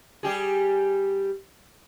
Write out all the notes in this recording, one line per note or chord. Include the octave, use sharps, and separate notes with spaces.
G3 G4 G#4